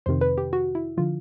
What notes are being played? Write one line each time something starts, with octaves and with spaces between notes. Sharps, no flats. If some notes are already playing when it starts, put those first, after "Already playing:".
F2 C3 D#3 C5
B4
G4
F#4
E4
D3 F3 F4